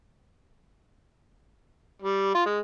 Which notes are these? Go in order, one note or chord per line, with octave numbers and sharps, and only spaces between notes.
G3
F4
G#3